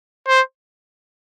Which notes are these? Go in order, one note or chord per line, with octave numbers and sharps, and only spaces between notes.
C5